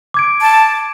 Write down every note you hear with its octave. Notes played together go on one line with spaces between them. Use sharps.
D6 G#6 D7
A5